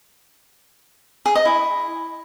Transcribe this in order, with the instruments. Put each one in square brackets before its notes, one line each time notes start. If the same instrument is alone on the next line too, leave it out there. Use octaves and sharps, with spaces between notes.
[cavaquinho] G#4
D#5
E4